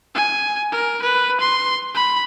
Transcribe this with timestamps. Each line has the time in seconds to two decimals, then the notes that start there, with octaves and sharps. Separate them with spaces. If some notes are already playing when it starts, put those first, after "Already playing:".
0.15 G#5
0.72 A#4
1.02 B4
1.40 C6
1.95 B5